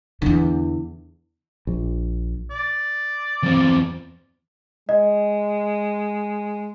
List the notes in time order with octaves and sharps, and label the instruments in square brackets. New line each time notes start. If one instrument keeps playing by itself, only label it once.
[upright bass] E2 D3
[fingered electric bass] A#1
[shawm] D5
[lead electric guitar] E2 C4
[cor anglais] G#3 [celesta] D#5